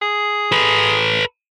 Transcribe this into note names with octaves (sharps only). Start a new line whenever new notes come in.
G#4
A4 B4